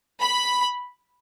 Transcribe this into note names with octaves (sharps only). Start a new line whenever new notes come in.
B5